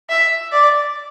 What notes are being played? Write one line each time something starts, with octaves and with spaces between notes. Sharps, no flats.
E5
D5